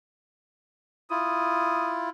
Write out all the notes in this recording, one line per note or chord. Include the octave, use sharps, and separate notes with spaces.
E4 F4 D#6